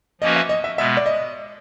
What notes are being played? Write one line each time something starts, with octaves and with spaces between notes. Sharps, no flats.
F3 A#3 C#4 F#4 B4 D#5
E5
D#5
E5
B2 G#3 B3 E5
D5
D#5